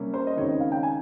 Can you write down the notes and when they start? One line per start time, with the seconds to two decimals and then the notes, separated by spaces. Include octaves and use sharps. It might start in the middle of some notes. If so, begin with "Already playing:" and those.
Already playing: C3 G3 A#3 C#4
0.14 C5
0.27 D#5
0.37 C#2 C3 D#3 C#5
0.49 D#5
0.60 F5
0.72 G5
0.83 G#5